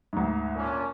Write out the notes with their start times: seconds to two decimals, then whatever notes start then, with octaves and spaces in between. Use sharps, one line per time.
0.13 D2 G#2
0.56 A#2 C#4 D4